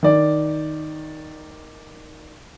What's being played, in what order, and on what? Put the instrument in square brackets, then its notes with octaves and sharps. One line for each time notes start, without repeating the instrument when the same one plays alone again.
[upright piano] D#3 D5